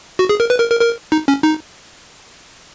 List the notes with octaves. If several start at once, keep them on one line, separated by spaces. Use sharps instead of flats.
F#4
G#4
A#4
B4
A#4
A#4
A#4
D#4
C#4
D#4